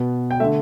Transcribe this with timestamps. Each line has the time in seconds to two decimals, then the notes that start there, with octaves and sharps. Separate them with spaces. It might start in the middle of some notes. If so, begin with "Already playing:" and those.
Already playing: B2 B3
0.31 G5
0.40 A3 E5
0.43 D3